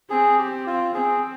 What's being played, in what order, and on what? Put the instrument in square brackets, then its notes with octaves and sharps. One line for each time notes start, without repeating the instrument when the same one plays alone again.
[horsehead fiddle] C4 [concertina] G#4
[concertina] G4
F4
[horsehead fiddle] C4 [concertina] G#4